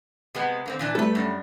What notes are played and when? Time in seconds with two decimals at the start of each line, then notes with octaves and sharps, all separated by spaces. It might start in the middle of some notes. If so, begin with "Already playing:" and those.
0.35 C3 G#3 B3
0.66 D3 A#3 C4
0.79 A#2 E3 D4
0.95 G3 A3 A4 B4
1.15 F#2 D4